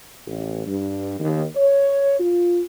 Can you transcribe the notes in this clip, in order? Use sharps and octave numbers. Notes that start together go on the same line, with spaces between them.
A1
G2
D#2
C#5
F4